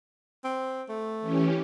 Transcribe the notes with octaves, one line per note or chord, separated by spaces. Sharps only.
C4
A3
E3 C#4 G4